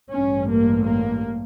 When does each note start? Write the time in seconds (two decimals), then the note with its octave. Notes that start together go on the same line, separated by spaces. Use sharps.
0.11 A1 G2 C#4
0.48 A#3
0.84 A#3